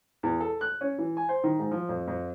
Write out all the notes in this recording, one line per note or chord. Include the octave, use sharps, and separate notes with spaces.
E2
A4
F#6
C#4
E3
G#5
C5
D#3
G#2
F3
F2
F2